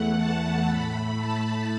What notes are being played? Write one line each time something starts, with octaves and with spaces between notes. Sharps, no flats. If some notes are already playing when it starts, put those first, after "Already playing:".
Already playing: E2 E3 A3 F#5
A5
A2 A3 B5
A5